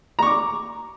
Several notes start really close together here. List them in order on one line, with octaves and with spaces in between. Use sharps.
A#5 C#6 D6